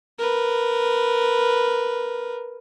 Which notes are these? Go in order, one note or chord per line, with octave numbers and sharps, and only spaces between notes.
A#4 B4